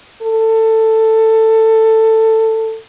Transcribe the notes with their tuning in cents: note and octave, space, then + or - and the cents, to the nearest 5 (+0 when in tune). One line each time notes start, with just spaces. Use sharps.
A4 +15